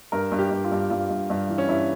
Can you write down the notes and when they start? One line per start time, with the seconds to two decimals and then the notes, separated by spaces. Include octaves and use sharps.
0.12 G2 A#4
0.32 G2
0.39 G4
0.51 G2
0.64 F4
0.72 G2
0.90 G2 F4
1.10 G2
1.30 G2
1.49 E3
1.58 C#4
1.69 G2 E4